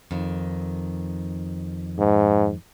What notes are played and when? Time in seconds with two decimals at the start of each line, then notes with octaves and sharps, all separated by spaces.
0.11 F2 D#3
1.98 G#2